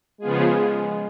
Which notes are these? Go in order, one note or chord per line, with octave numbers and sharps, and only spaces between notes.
C#3 F3 G#3 B3 F4 G#4